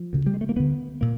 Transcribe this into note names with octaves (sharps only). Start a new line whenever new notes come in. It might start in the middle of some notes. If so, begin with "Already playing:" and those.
Already playing: F3
D2 C#3
G3
G#3
A3
A#3
D2 D3 B3
A#2 A#3